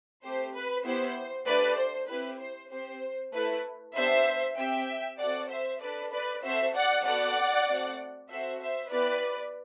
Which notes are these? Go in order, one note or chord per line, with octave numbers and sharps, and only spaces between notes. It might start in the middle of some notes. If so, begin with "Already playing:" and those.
A3 C4 G4 C5
B4
B3 E4 G4 C5
A3 D4 G4 B4 D5
C5
C4 E4 G4 B4
C5
C4 G4 C5
A3 E4 A4 B4
B3 D4 G4 C5 E5
C4 G4 E5 G5
C4 F#4 A4 D5 F#5
C5 E5
D4 A4 B4 D5
B4 D5
C4 F#4 A4 C5 E5
D5 F#5
B3 F#4 A4 D5 F#5
A3 C4 F#4
C4 F#4 A4 C5 E5
C5 E5
B3 E4 G4 B4 D5